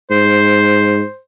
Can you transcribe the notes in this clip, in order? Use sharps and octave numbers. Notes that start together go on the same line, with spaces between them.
G#2 C5